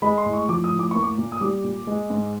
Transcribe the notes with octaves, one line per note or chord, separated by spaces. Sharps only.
G#3 B5
C6
A2
C#6
F3 D6
D#6
A2
D6
A#3 C#6
D6
A#2
D#6
G3 D6
A#2
G#3
G#2